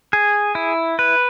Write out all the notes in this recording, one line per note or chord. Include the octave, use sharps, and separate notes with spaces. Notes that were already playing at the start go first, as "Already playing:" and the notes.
G#4
E4
B4